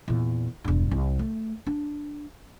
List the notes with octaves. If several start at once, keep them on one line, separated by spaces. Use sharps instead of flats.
E2 A#2
E1 G2
C2
A3
D4